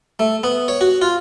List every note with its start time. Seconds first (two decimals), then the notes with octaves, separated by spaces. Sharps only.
0.19 A3
0.44 B3
0.68 C#5
0.81 F#4
1.02 F4